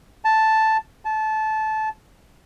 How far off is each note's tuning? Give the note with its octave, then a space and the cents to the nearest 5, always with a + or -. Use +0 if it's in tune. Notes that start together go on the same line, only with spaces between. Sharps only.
A5 +0
A5 -20